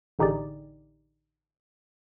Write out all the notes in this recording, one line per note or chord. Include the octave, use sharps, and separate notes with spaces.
A1 D3 D#4 G4 G#4 D5